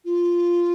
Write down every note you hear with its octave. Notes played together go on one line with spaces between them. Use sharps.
F4